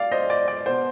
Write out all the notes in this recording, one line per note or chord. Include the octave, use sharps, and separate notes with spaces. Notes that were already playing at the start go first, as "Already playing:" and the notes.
Already playing: D5 F5
C5 D#5
D5
D5
B2 C5